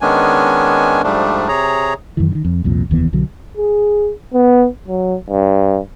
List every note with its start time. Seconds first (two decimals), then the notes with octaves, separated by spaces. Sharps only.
0.01 D#3 G#3 B3 C#4 D4 G#5
1.03 G#2 F3 G3 A3 D4
1.48 C3 G#4 C#5 A#5
2.17 F#2 D#3 E3
2.32 D3 D#3
2.45 F2
2.64 C2 F2 A#2
2.90 F1 D#2 E3 B3
3.13 B1 D3 F#3
3.57 G#4
4.34 B3
4.88 F#3
5.30 G2